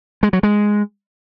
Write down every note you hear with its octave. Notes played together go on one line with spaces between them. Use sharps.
G#3
F#3
G#3